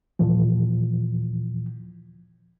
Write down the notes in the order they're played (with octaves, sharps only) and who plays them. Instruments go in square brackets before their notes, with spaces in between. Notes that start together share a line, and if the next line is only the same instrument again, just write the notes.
[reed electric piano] D#2 A#2 E3 F3